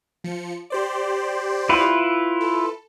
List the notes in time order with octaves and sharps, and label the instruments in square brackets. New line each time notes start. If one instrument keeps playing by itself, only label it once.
[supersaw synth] F3 C#7
G4 C5 D5
[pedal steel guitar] E4 F4 B4
[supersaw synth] A4